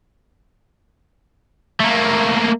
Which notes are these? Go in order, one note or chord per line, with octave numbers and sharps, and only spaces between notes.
A3 A#3